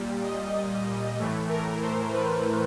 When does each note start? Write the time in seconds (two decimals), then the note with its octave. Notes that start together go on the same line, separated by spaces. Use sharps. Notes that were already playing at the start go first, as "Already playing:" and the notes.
Already playing: A#2 G3
0.23 D#5
1.17 A2 E3 A3
1.49 A#4
1.81 C5
2.12 B4